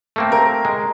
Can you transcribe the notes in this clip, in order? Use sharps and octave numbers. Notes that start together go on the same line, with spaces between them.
A3 A#3 C4
A#4
G#3